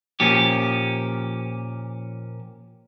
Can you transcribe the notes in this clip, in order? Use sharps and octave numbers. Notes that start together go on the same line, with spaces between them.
A#2 F3 C#4 G4